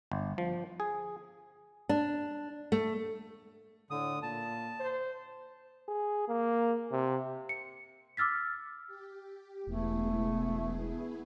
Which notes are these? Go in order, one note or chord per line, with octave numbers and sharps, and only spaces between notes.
G1
F3
G#4
D4
A3
A2 D3 D#6
A#2 A5
C5
G#4
A#3
C3
C#7
D6 E6 F6 A6 B6
G4
E1 A3 B3 E4 G#4